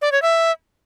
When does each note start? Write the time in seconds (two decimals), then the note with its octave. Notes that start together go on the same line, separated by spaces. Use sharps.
0.02 D5
0.12 C#5
0.22 E5